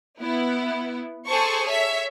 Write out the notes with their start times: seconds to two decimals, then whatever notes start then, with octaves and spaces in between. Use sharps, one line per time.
0.21 B3 E4
1.28 G#4 A4 C5 A5 C#6
1.69 C#5 E5 B6